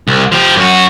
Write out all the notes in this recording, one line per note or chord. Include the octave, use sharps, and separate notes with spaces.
C2
F3 G4
F#2 F#4